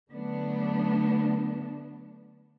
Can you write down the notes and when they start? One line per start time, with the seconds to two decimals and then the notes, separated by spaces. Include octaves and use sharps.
0.12 D3 F#3 A3 B3 D4